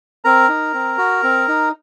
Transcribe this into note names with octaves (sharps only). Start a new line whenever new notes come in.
C4 A#4 A#5
D#4
C4
F#4
C4
D#4